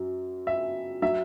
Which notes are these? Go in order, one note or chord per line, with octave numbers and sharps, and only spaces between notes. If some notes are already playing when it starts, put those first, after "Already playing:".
Already playing: F#2 F#3
E5
F#3 E5